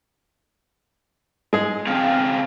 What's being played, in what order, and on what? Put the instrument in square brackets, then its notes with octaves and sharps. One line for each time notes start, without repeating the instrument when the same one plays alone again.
[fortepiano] G#3 G#4
[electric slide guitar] C#3 C4 F5